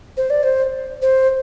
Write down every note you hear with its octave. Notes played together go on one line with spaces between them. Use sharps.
C5
D5
C5
C5